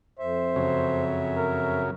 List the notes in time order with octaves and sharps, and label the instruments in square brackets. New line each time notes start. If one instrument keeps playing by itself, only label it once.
[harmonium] F2 E5 [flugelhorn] C5
[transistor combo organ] F#2 C#3
[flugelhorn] A#4